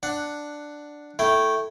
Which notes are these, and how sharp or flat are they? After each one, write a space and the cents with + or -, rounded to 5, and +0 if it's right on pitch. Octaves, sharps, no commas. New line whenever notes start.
D4 +5 F#5 +0
A3 +0 E4 +0 G5 -15